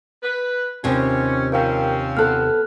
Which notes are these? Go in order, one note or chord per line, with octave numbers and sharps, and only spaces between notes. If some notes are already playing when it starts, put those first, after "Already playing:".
B4
D#2 C3 C#4 F4 C5
F3 C4 C#4 A#4 F5 G5
B3 A4 F6 F#6